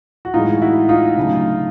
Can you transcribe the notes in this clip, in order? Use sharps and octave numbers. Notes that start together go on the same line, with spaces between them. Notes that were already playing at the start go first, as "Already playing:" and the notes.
F#4
A2 E3 G#3 D#4 F4
E4 F#4
D#4 F4
D2 C#3 F#3 A3